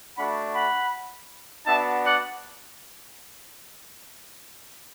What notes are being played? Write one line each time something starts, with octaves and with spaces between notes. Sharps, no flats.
A3 D4 F#4 F#5 B5
F#5 B5
B3 D4 F#4 E5 A5
D5 F#5